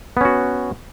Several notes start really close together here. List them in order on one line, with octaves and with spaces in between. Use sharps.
B3 C#4 F#4